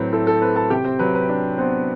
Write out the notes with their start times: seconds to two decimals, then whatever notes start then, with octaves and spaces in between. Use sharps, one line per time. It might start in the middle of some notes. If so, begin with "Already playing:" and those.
Already playing: A2 F#3 C4 B4
0.13 E4 A4
0.27 A4
0.42 C4 B4
0.56 A4 A5
0.70 C3 G4 G5
0.85 C4 C5
0.99 F#3 B4
1.15 B4
1.29 D4
1.58 B3 C4 C5